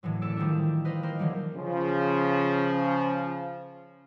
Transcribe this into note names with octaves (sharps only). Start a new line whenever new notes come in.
A2 D3 E3 F#3
F#1 A3 A4 E6 D7
D#3 F3 G3 D4
B4 C5 D#5 F5 G5
A#3 A#4 C5
D3 E3 F#3 G3 D#4
C#3 F3